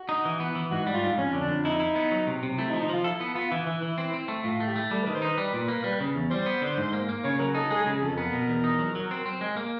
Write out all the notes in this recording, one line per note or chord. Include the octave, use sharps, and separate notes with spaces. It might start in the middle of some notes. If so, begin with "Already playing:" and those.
Already playing: F#4
D#4
E3
B3
E3
G#2 F#4
G3
F4
G#2
F2 C#4
D3
D4
F2
D#4 E4
E4
B3
F#3
C3
C3
A3 E4
D#4
F3
D#4
F3 F4
E4 A4
B3
B3 F4
E3 E4
E3
E3
C4
C4
A3
A2 F4
A3
G4
A3
G3 A4
B4
D#3
C5
D#4 B4
G3
A#2
A#3
G3
C#3
E2
G3 C5
B3
D3
G#2
A#3
A#3
C#3 C#5
F#3 A#4
D#4 A4
G#3 G#4
G#4
C#3
G#4
F2 A4
B3 A#4
B2
E2
D#4
F#3
F#3
C4
C4
G#3
A#3